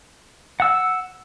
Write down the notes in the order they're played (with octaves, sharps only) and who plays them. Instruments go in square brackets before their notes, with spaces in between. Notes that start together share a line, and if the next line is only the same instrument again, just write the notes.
[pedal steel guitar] F#5 E6